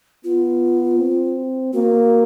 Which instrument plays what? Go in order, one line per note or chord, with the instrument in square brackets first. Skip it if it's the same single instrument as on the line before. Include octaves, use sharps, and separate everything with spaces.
[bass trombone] B3 [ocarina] F4
[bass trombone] C4
[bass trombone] A#3 [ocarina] F#4